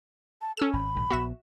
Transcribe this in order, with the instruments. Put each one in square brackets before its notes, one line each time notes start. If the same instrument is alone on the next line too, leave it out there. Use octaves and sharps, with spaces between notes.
[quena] A5
[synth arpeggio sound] C#4 E6 E7 [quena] A4
[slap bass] G#1 [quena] B5
[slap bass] A#1 G#2 D#3
[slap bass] A#1 B3 [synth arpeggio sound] F#4 E5 E7